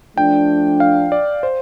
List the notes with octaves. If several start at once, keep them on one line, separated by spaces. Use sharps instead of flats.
F3 A3 D4 G5
F5
D5
C5